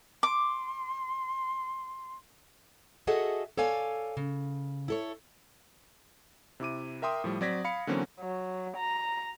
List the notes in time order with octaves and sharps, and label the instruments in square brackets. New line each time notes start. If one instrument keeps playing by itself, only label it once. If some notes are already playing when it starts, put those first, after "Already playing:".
[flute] C6 [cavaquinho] D6
[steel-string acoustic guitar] F#4 G#4 A4 D#5 E5 F#5
A4 C#5 D5 F5 G#5
C#3
E4 A4 C#5
[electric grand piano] C3 E4 D6 D#7
A#4 E5 G5 C6 D#6
A2 F3 G3
F#3 C4 D5 G#6 A#6 B6
F5 B5 C#7
D3 E3 F#3 A#3 C4 C#4
[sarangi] F#3
A#5